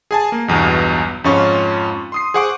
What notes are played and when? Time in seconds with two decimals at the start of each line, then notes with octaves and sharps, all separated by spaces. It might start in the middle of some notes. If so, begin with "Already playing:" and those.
0.11 G#4 G#5 A5
0.32 A#3
0.48 B1 E2 G2 B2
1.24 F2 G#2 C#4 F4 C#6
2.12 C6 D#6 C7
2.34 G#4 C5 F#5 C#6 D6